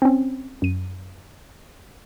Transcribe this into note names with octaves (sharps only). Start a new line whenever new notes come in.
C4 C#4
F#2 D#7